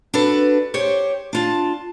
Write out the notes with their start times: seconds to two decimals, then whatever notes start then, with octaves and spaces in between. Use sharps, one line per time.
0.14 D4 F#4 A4 B4
0.74 G4 C5 C#5
1.33 D4 F4 A5